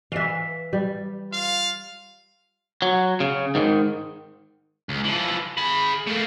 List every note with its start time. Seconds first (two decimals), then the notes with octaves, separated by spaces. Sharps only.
0.12 E3 E5 F5
0.73 G3
1.32 F4 F5
2.82 F#3
3.20 C#3
3.55 G#2 D#3
4.89 C#2
5.04 E3 F3
5.58 G#4 B5
6.07 A3 A#3